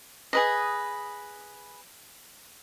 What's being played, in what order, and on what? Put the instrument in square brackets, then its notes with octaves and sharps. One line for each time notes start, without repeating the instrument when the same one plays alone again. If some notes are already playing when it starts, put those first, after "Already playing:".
[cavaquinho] G#4 B4 D#5